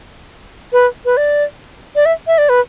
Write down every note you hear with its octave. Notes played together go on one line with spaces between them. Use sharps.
B4
B4
D5
D5
E5
E5
D5
B4